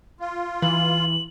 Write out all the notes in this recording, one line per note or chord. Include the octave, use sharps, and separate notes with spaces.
F4
E3 F#7